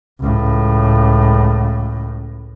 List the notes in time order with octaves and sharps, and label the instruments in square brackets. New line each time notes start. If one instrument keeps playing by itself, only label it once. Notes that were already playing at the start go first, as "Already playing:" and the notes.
[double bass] C#2 A2